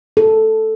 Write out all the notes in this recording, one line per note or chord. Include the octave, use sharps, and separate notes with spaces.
A4